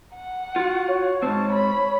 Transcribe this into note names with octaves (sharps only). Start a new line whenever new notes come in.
F#5
F4 F#4
C#5
G#2 C4 A5
B5